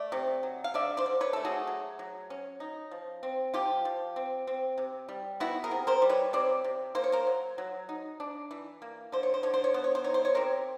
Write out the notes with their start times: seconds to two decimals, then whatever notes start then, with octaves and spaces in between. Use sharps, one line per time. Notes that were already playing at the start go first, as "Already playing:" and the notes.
Already playing: A3 D5 E5
0.12 C3
0.43 F#3
0.64 F5
0.74 D3 D5 E5
0.97 C5 D5
1.06 D3
1.21 B4 C#5
1.33 A3 A4
1.45 F#4 G#4
1.67 F#3
1.99 F#3
2.30 C#4
2.60 D#4
2.91 F3
3.23 C4
3.54 F3 F4 G4
3.85 F3
4.16 C4
4.47 C4
4.78 C3
5.09 G3
5.40 B3 E4 F#4
5.64 G#4 A#4
5.71 C3
5.87 A#4 C5
6.02 G3
6.09 B4 C#5
6.33 C3 C5 D5
6.64 C3
6.95 A#3 C5
7.04 C#5
7.12 A#4 C5
7.27 F#3
7.58 F#3
7.89 D#4
8.20 D4
8.51 E3
8.82 A#3
9.12 D3 C5
9.23 C#5
9.34 C5
9.43 D3 C#5
9.54 C5
9.64 C#5
9.74 B3 C5
9.84 C#5
9.95 C5
10.04 D#4 C#5
10.14 C5
10.25 C#5
10.35 C3 A#4 C5